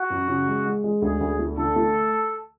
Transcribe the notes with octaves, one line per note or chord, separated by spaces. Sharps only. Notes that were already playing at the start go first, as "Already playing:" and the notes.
Already playing: F#4
F#2
C#3
G#3
G#3
G#3
D2 G#4
D2
A3
D3 A4
A3